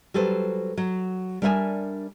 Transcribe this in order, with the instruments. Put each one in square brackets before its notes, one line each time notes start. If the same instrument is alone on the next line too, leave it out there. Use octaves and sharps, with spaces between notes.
[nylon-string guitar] F#3 G3 A4 B4 C5
F#3
G3 D4 A#4 E5 G5 G#5